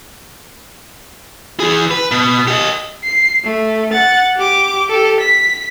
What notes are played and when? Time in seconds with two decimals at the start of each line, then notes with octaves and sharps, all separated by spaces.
1.60 E3 G#4
1.91 B4
2.12 B2
2.48 G4 D#5
3.04 C7
3.45 A3
3.92 F#5 A6
4.36 G4 D6
4.90 G4 A4
5.20 B6